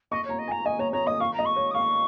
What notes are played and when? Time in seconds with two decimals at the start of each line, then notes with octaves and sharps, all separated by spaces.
0.11 D#5 C#6
0.25 C#5 A#5
0.39 D#5
0.48 G#5
0.52 A#5
0.65 D#5 G#5
0.79 C#5 A#5
0.92 C#5 A#5
1.07 D#5 D#6
1.20 F5 C#6
1.34 D#5 A#5
1.46 C#6
1.56 C#5
1.71 D#6
1.74 F5 C#6